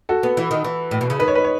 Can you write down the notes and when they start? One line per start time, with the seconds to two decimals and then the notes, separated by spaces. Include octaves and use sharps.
0.09 F#4 A4
0.23 B3
0.37 E3
0.51 D#3
0.64 E3
0.91 A2
1.01 B2
1.10 C#3
1.20 D#3 B4
1.28 C#5
1.35 B4
1.44 C#5